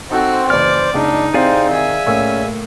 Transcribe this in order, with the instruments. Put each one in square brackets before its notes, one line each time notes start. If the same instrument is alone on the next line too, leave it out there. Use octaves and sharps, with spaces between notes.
[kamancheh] C4 F#4 [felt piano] D#4 A4 [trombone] C5
[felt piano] F#1 E3 [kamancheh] D5 [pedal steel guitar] F6
[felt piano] F#1 C#2 [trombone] D4 [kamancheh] D#4
[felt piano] C3 E4 [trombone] C4 [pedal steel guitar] G#4 D5 F5
[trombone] D#3 [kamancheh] E5 G#5
[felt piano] A2 A#3 E6 [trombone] C#4